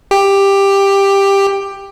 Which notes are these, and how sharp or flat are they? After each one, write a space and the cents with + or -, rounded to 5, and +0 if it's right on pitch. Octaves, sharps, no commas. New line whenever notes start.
G4 +10